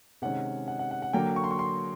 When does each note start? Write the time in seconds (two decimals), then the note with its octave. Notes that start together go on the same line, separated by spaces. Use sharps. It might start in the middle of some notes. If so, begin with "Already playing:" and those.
0.22 C3 D#3 G#3 C#4 F#5
0.68 F#5
0.79 F#5
0.91 F#5
1.02 F#5
1.13 D3 F#3 A#3 G5
1.36 C#6
1.44 C6
1.51 C#6
1.59 C6